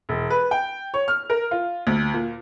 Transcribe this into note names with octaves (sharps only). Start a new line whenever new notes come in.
E1
B4
G5
C#5
F6
A#4
F4
D2
A#2